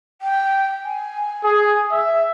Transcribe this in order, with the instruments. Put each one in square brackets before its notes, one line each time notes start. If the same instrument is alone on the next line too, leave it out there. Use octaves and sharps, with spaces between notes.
[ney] G5
G#5
[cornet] G#4
E5